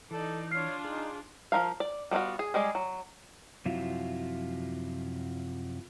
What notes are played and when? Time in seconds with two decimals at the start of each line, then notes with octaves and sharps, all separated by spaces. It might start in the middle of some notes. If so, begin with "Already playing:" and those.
0.11 E3 D#4 A4 D5
0.51 D4 F4 C#5 F6 C7
0.85 D#4 G#4
1.52 F3 E4 A#4 F5
1.80 D5
2.11 G3 B3 D#4 F4 F#4
2.39 G#4
2.54 G3 G#3 G#4 D5
2.75 F#3
3.65 F#2 C3 F3 F#3 E4 F4